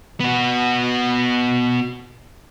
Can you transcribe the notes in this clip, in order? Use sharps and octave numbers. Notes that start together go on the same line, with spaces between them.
B3 F#4